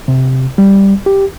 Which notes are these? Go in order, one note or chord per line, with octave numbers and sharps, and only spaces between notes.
C3
G3
G4